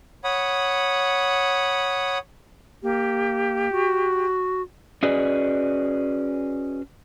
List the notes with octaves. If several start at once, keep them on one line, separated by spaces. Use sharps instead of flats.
C#5 F#5 B5 D#6
A#3 G4
F#4
C#4 F#4 G#4 B4 D5 D#5